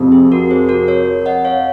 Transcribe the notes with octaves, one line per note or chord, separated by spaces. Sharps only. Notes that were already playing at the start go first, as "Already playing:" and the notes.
Already playing: F2 C3 C4
G#4
F#4 A#4
G#4 C5
F#4 A#4
A#4 C#5
D#5 F#5
C#5 F5